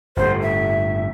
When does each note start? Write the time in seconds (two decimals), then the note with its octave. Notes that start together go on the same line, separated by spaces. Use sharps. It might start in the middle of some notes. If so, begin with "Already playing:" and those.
0.16 G1 A2 C5
0.41 E5